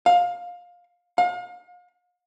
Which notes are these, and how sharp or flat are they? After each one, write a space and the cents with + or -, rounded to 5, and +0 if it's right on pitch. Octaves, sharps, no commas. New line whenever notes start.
F5 +20
F5 +40